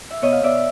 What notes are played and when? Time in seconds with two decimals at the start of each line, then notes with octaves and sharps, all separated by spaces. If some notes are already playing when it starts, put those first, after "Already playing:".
0.11 E5
0.22 B2 C#5 D#5
0.32 F5
0.43 B2 D5 E5